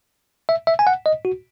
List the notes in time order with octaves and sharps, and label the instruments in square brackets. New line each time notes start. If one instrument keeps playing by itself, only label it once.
[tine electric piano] E5
E5
G#5
F#5
D#5
F#4